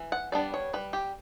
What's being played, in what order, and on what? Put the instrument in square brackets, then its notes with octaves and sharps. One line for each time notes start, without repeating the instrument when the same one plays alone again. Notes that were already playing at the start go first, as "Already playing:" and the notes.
Already playing: [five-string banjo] E3
F#5
G3 B3 D4 D5
C#5
G3 B4
G4